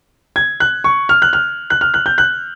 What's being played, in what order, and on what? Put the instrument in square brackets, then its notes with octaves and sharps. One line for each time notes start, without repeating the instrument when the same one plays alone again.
[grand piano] G#6
F#6
C#6
F6
F#6
F6
F#6
F6
F#6
G6
F#6